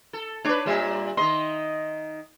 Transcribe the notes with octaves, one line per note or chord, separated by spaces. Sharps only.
A4
D4 B4 C#5 D6
A#2 G3 E5
D#3 D#5 C6